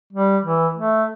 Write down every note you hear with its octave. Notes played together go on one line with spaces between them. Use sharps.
G3
E3
A3